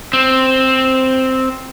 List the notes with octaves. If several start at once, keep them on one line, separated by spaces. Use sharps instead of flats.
C4